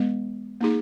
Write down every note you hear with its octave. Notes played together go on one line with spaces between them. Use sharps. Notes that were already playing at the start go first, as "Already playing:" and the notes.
Already playing: E3 G#3 B3
A#3 D#4 G#4